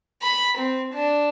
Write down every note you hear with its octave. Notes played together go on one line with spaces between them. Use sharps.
B5
C4
D4